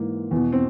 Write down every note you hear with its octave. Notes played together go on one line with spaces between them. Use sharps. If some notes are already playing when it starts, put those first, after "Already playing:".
Already playing: G#2 E3 A#3
E2
B2
C4